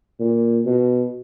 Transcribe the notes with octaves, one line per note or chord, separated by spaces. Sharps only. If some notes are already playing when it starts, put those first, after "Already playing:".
A#2
B2